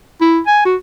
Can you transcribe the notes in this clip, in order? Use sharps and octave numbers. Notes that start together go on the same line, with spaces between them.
E4
G#5
F#4